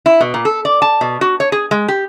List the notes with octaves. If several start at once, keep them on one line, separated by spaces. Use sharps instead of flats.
E4
B2
A#2
A4
D5
A5
B2
F#4
C#5
G#4
G#3
G4